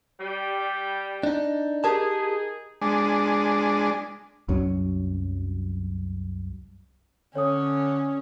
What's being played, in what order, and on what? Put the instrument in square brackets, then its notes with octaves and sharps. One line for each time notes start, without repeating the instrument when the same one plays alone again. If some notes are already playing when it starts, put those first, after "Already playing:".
[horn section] G3
[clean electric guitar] D4 D#4
[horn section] D#4 G#4 [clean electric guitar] G4 A#4 A5
[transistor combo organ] G#3 D4
[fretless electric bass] C2 F#2 F#3 C#4
[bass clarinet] D3 [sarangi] C#4 [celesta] C#5 D#6